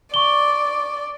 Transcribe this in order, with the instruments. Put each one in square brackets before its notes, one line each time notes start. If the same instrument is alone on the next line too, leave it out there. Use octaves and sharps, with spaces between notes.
[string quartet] D5 [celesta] C#6 G7